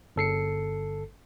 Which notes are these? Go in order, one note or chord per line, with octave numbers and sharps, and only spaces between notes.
G1 A4 C7 C#7